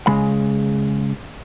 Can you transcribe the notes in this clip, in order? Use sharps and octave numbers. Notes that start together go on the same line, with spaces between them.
C#3 G#3 B5